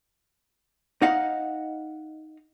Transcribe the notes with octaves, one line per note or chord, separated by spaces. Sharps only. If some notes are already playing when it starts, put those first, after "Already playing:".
D#4 D#5 F5 F#5